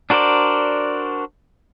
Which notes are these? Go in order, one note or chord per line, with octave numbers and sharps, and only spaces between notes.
D4 F#4 A#4 C5 D5